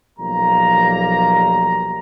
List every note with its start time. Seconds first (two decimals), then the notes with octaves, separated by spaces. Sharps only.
0.19 B1 F3 G3 A#3 A#5